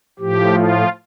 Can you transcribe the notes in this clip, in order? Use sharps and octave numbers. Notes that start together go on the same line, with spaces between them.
A2 F3 G4
F4